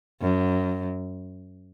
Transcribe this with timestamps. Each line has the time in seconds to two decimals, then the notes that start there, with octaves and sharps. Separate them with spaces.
0.21 F#2